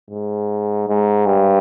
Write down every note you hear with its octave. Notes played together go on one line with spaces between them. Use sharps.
G#2
G#2
G2